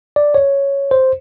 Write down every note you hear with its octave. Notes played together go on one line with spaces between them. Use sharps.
D5
C#5
C5